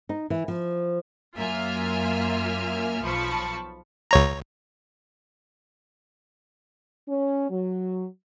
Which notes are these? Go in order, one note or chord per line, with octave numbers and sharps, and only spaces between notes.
D#4
E3
F3
F#2 A#3 F4 E5 G#5 F6
B1 F3 A5 B5 C#6
C#2 C#5 A#5
C#4
F#3